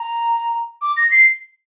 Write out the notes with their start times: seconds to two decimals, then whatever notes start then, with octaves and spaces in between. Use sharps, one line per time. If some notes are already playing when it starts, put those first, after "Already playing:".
Already playing: A#5
0.82 D6
0.97 A#6
1.11 C7